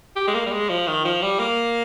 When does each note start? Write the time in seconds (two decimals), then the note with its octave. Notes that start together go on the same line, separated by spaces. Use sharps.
0.16 G4
0.28 G#3
0.34 A#3
0.46 G3
0.52 G#3
0.69 F3
0.87 D#3
1.05 F3
1.22 G3
1.39 A#3